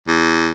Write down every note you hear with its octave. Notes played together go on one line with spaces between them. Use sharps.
E2